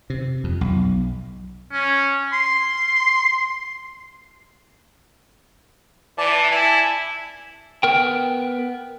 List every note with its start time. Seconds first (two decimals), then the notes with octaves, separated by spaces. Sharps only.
0.10 C3
0.44 F2
0.61 B1
1.72 C#4
2.33 C6
6.18 E3 D5 A5
6.51 E4 G#5 A5
7.83 B3 A#4 G5